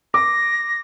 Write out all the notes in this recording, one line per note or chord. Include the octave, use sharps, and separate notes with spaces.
D6 A#6